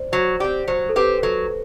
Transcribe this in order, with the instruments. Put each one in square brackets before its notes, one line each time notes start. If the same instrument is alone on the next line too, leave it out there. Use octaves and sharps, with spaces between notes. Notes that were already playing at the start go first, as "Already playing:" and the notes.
Already playing: [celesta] C5 D5
[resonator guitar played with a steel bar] F#3 [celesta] C5
[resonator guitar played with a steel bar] C4 G4 [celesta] D5
[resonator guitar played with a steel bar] F#3 [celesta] C5
[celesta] A4
[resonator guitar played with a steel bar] C4 G4 [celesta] B4
[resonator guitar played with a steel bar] F#3 [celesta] A4